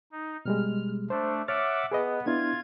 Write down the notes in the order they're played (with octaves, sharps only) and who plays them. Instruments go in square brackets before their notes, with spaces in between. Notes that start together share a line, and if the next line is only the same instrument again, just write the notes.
[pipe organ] D#4
[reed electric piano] B2 G3 G#3 [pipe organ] F6
[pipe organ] A3 D4 [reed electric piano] C5
[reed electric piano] C#5 F6 A6 [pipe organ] E5 F#5 D6
[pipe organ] B3 [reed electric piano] G#4 B4 D#5
[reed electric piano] B3 D4 E4 [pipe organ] F4 G#6